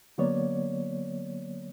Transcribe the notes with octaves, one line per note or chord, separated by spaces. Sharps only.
D3 F#3 A#3 B3 C#5 D5